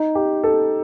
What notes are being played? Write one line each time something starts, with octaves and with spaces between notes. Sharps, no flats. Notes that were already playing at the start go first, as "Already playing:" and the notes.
Already playing: D#4
G4
A4